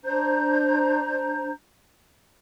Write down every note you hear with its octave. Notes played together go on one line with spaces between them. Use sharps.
D4 C5 A#5 G6